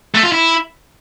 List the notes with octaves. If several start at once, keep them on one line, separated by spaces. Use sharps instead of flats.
A3
F4
E4